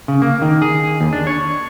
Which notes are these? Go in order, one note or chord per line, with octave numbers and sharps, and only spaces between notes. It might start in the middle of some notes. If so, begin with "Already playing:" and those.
C#3
A#3
D#3
G#4
D#2
D4
C#5